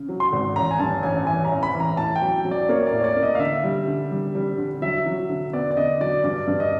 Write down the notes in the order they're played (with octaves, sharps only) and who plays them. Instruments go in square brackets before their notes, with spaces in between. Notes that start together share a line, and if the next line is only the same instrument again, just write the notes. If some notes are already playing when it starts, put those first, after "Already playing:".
Already playing: [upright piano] C#3
F#3
[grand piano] C6
[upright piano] G#1
[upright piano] A1 [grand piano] A#5
[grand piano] G#5
[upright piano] G2 [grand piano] A5
[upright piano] A1 [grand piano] G#5
[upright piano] E3 [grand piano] G#5
[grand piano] A#5
[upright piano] A1
[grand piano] B5
[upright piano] E3
[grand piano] A#5
[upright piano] A2 [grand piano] A5
[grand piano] G5
[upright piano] F#3
F#3
[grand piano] D5
[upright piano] A#3 [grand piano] C#5
[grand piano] D5
[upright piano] A2
[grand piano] C#5
D5
[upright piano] A#3
[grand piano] D#5
F5
[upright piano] D3 [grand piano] E5
[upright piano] G3
D3
G3
G3
D3
[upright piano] F#3 [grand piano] E5
[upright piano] F#3
D3
[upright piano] B3 [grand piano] D5
[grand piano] D5
[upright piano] D3 [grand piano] D#5
[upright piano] F#3 [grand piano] D5
[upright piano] G2 [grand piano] D5
[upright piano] G2
[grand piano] D#5